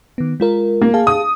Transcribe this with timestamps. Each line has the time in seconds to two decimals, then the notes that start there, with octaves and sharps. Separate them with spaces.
0.18 D#3 B3
0.40 G#3 F4 A#4
0.81 A#3
0.94 G#4 F5 A5
1.07 D#6